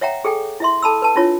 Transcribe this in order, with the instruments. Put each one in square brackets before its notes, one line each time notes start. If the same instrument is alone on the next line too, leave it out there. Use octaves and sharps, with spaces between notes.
[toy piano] C#5 E5 F#5 G5 A#5
G#4 A4 G5 G#5
E4 E5 C6
A4 A5 B5 E6
B4 A5
D4 E4 F4 C#5